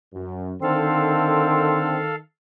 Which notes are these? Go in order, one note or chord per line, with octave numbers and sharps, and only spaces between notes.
F#2
D3 D#3 C4 A4 F5